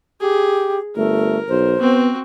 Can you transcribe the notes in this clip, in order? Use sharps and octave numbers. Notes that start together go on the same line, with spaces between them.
G4 G#4
G1 A3 A#4
B1 C5
B3 C4 F#4